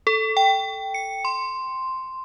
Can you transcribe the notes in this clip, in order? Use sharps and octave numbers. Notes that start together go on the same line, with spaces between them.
A4
G5
C#7
C6